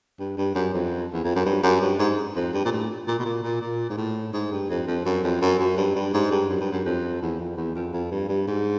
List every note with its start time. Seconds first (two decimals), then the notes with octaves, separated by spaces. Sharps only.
0.19 G2
0.37 G2
0.55 F#2
0.74 F2
1.13 E2
1.24 F2
1.35 F#2
1.45 G2
1.63 F#2
1.81 G2
1.99 G#2
2.35 F2
2.53 G2
2.65 A#2
2.72 A2
3.07 A#2
3.19 B2
3.25 A#2
3.43 A#2
3.61 A#2
3.90 G#2
3.97 A2
4.33 G#2
4.52 G2
4.69 F2
4.87 F2
5.05 F#2
5.23 F2
5.41 F#2
5.59 F#2
5.77 G2
5.95 G2
6.13 G#2
6.31 G2
6.49 F#2
6.60 G2
6.71 F#2
6.85 F2
7.22 E2
7.39 F2
7.57 E2
7.75 F2
7.93 F2
8.11 G2
8.29 G2
8.47 G#2